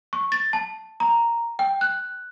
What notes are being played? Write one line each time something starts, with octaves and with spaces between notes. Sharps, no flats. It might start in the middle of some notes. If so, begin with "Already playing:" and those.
C#6
A6
A5
A#5
G5
F#6